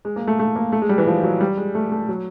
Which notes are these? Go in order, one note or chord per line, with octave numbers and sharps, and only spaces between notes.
G#3
A#3
A3
A3
A#3
A3
G#3
G3
E3
F3
F#3
G3
G#3
A3
A3
F#3